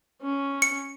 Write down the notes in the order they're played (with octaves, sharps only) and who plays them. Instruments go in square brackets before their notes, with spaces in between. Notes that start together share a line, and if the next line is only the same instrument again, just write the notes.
[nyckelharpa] C#4
[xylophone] C#7